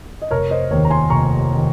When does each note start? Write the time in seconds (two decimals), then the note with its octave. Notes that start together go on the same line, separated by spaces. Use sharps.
0.22 D#5
0.31 F1 A#4 C#5
0.51 C5 D#5
0.71 D#2 D#3 A#4 C#5
0.85 A#5
0.90 G#5 C6
1.10 F1 A#5 C#6
1.54 D#3